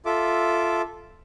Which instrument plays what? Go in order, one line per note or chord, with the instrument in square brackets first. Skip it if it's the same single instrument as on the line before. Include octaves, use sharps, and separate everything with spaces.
[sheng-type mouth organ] F4 A4 E5 D6